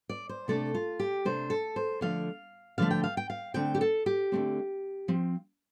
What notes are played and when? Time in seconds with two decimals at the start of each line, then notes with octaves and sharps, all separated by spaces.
0.09 D5
0.29 C5
0.48 C3 A3 D4 A4
0.74 F4
1.00 G4
1.25 C3 A3 D4 C5
1.50 A4
1.76 C5
2.01 D3 F3 A3 F5
2.78 D3 F3 A3 F5
2.91 G5
3.04 F5
3.17 G5
3.30 F5
3.54 D3 A3 C4 G5
3.75 G4
3.81 A4
4.06 G4
4.32 D3 A3 C4
5.08 F3 C4